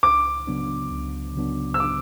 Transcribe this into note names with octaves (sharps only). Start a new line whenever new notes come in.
C#2 D6
C#3 F#3 B3 D4
C#2
C#3 F#3 B3 D4
E6
D6